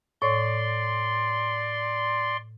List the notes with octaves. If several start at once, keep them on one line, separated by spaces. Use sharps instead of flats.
A2 C#5 D5 C6